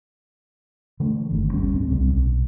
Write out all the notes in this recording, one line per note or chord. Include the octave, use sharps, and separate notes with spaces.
D3 E3 A3
G1 D#3
G1 D2 G3 C#4
D1 C4
C2 C3 G3
B1